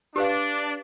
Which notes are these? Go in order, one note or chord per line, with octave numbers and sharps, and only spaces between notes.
D4 G4 B4 F5